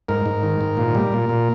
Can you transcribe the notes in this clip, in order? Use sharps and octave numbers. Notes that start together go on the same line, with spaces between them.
G#2 A#4
G#2
D#3
G#2
A#2
G3
A#2
A#2